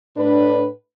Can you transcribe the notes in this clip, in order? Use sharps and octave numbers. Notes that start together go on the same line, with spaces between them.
A2 D4 B4